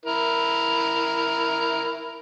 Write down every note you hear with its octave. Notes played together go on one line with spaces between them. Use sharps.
E4 A#4